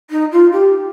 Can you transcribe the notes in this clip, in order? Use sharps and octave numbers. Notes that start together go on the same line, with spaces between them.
D#4
F4
G4